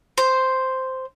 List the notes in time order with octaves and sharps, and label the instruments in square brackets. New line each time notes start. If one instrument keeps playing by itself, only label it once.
[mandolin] C5